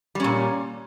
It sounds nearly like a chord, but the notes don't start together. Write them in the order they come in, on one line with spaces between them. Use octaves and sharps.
G3 C#4 A#2